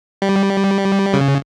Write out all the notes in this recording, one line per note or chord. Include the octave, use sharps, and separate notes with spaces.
G3
C#3